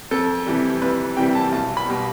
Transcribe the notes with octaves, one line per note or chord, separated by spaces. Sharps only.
F2 A4
C3 E3 G3
F2 B4
C3 E3 G3 G5
A5
B1 A5
B5
B2 G3